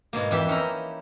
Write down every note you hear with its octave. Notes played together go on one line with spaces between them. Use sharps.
G#2 B2 A#3
F2 E3 G4 E5
C#4 D#4 E4 A#5